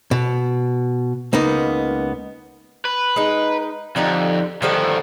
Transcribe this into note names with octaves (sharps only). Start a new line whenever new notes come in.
B2
C#2 A#3 B3 D#4
B4
G#3 D#4
F2 D3 D#4 G4
G2 D3 D#3 F3 A4